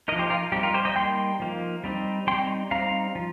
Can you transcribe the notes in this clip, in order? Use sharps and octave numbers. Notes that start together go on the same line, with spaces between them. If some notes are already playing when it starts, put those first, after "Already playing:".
F3 A#3 D#4 A#4 D#5
G4 C5
F4 A#4
G3 C4 D#4 G4
F4 A#4
G4 C5
D#5 G5
G3 A#3 D#4 G5 C6
F3 A#3 D#4
G3 C4 D#4
G3 C4 D#4 G5 C6
G3 C4 D#4 F5 A#5
F3